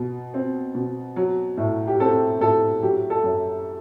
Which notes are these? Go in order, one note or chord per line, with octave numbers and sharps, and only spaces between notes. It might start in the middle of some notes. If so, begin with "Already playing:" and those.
Already playing: B2
C4
B2
F#3
A2
G4
C4 A4
A2 A4
F#3 G4
A4
F#2